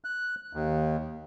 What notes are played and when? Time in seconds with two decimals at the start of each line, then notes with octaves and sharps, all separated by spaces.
0.04 F#6
0.53 D#2